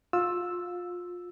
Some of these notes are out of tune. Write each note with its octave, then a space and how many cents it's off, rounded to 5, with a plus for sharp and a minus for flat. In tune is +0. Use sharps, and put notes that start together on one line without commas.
F4 +25 E6 +0